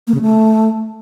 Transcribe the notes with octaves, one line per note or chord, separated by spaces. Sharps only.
A#3
C#3
A3